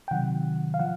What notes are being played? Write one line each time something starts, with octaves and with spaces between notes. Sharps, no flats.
G5
C3 D#3 F#3 F#5
F5
F3 F#5